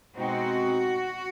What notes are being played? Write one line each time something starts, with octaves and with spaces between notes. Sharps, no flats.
B2 G#3 C4 D#4 F#4